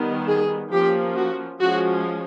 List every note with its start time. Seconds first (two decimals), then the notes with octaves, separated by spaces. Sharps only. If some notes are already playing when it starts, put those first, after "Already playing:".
Already playing: D#3 G3 B3
0.27 G#4
0.72 F3 A#3 C#4 G4
1.16 F#4
1.60 F3 G#3 C#4 F#4